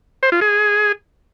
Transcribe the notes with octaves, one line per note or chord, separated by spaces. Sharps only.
C5
F4
G#4